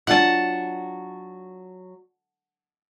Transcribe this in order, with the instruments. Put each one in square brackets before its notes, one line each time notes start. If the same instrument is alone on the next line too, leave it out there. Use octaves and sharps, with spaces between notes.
[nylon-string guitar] F#3 D4 F4 [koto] F#5 A5